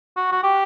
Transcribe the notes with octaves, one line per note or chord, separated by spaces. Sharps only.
F#4
F#4
G4